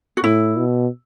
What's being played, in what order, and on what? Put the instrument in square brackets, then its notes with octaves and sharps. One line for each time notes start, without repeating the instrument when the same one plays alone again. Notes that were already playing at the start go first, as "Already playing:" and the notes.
[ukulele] F#4
[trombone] A2 [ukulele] E4
[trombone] B2